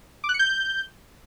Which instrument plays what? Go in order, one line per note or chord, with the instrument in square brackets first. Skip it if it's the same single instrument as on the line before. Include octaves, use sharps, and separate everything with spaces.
[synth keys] D6
F#6
C#7
G6